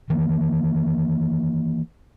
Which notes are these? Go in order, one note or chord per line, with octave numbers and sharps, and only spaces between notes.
D#3 E3 A#3